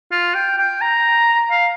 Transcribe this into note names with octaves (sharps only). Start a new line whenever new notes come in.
F4
G5
G5
A#5
F5